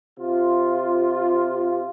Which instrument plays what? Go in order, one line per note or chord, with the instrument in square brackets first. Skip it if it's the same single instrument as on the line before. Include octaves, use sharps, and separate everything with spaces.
[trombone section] C3 F4